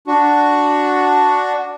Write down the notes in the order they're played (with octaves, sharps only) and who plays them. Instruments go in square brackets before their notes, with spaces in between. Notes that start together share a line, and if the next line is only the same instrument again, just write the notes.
[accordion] D4 F#4